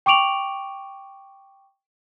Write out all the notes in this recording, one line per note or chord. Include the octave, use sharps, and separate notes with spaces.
G5 C#6 D6 D7 F7 F#7